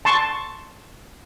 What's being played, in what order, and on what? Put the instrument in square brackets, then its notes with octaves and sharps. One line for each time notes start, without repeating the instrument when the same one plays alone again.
[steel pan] A5 C6 C#6